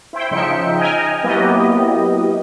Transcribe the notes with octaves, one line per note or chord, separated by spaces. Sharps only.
E4 C5 G5
C#3 F3 D#4 E5 G5 C#7
D#5 G5 G#5 A#5 F6
F#3 A#3 B3 E4 G4 D#5